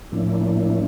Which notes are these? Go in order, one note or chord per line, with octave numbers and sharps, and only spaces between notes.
A2 F3 A#3 C#4 D4 E4